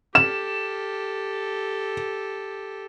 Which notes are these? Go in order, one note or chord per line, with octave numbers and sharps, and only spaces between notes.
G4 A4 E7